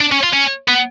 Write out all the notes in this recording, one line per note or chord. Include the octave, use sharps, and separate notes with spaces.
D4
C#4
F4
C#4
B3